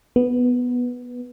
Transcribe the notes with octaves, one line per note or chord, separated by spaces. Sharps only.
B3